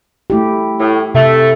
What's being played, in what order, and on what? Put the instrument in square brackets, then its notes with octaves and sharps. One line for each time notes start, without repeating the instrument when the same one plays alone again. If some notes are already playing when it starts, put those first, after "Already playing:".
[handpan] A3 E4 G4
[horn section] A2
[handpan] C3 [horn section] A3